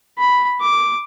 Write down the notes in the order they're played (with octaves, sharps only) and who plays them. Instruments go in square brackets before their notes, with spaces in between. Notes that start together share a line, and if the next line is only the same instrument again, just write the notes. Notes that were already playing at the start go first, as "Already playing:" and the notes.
[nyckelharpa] B5
D6